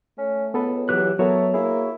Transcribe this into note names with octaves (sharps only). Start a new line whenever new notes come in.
A3 C#4
C#2 B3 A4 B4
E3 F#3 G4 F#6
F#3 A3 B3 F#4 A4 A#4 C#5
A#3 E4 G#4